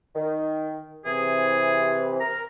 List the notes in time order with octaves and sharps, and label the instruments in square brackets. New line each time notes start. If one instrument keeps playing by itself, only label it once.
[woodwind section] D#3
[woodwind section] C3 E3 [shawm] G#4
[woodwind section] A#4 [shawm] A#5